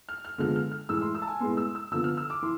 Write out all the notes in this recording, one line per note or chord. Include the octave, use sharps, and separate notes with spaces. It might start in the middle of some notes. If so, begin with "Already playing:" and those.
F6
F6
D3 F3 G#3 B3 F6
F6
F6
A2 E3 G#3 E6
C6
E6
A5
G#5
A2 G#3 B3 C6
E6
E6
D3 F3 B3 E6
F6
E6
D6
E3 C6